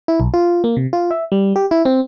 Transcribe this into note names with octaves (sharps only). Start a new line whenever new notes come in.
E4
B1
F4
A#3
C3
F4
E5
G3
G4
E4
C4